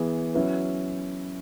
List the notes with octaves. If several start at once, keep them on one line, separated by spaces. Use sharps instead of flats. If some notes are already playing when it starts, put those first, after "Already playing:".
Already playing: E3 B3 G#4
F#3 C#4 E4 B4